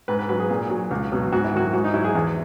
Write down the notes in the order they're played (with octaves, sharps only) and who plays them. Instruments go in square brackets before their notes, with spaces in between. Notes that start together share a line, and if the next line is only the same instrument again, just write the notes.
[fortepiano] G#2 B4
B4
F#3 B4
G#4
A#2
F#3
C#2
B2 F#3
G#2 F#4
E4
D#3 F#3 F#4
G#2 F#4
D#4
F#3 E4
G#4
E2